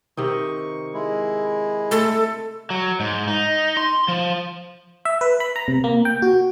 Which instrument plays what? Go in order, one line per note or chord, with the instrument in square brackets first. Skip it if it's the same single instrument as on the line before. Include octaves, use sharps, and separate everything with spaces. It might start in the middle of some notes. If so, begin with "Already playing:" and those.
[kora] C3 D#3 D#4 [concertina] C#6
[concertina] G#3 E4
[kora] A3 [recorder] A4
[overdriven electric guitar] F#3
G#2
D#4
C6
F3
[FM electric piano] E5
B4
B5
A#5
C3
A#3
G5
F#4